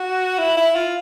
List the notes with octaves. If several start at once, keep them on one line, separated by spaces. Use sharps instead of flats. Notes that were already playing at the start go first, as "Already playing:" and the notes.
Already playing: F#4
E4
E4
F4